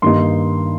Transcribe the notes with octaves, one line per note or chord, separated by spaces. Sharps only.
G2 D#3 A#3 D#4 C6